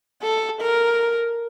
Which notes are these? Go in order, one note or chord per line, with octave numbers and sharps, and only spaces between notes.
A4
A#4